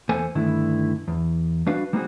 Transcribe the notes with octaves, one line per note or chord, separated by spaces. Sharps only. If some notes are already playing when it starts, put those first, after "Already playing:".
E2 A#3 A4 C5 G#5
G2 D3 D#3 A3 E4
E2
G3 D4 F#4 B4 F5
G3 A#3 C4 D#4 F#4 G#4